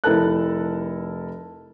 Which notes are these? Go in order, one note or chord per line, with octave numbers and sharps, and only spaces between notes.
F1 E4 A4 A#4 A5 F#6